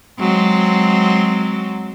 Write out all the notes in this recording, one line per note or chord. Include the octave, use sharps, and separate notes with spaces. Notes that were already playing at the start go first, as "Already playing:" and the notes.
F#3 G#3 C4